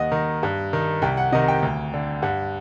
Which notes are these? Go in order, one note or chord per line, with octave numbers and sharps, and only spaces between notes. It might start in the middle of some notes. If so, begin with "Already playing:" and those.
Already playing: D#2 D#5 F#5
D#3
G2
D#3
C2 G5
F#5
C3 D#3 D#5
G5
D2
D3
G2 F#5